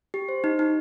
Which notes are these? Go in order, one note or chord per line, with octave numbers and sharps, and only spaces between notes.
G4
C5
D#4
D#4